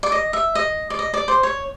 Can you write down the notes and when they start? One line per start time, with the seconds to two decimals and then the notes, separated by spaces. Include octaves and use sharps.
0.03 D5
0.12 D#5
0.33 E5
0.55 D#5
0.90 D5
0.99 D#5
1.14 D5
1.28 C5
1.43 C#5